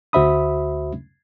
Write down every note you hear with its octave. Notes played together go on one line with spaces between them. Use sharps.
D2 F#4 C5 E5 B5 D#6